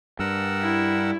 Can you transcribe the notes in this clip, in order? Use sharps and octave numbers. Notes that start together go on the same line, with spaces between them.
G2 A#4 F#5 E6
E4